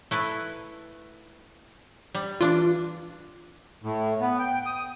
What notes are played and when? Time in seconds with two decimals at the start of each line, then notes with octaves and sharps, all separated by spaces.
0.11 A3 E4 B4
2.15 G3
2.41 E3 D4 F4
3.83 A2
4.21 B3
4.39 G5
4.66 D#6